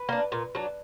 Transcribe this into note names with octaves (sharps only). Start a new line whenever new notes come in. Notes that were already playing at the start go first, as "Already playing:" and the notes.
Already playing: B4
A#3 D4
A#2
F#3 D4